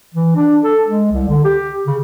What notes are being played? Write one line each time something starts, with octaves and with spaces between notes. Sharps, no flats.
E3
D4
A4
G#3
C2
D3
G4
C#3